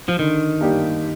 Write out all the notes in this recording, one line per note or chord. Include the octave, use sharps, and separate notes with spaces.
F3
D3 D#3
G3 A#3 D4 G4